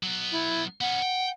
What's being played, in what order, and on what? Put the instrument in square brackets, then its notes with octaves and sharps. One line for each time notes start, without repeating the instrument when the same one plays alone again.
[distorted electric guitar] F#3 B3
[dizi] E4
[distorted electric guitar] B3 C#4 [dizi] F#5
[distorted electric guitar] G5